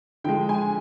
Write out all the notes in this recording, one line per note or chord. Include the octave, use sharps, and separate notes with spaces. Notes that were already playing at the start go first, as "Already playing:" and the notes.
D3 F3 G#3 G5
G#5